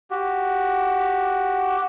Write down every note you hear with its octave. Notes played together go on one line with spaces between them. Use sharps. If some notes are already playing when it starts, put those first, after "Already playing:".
F#4 G4